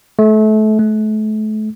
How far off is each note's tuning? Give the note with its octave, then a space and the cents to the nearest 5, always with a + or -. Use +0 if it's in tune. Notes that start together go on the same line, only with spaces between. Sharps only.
A3 -30
A3 -35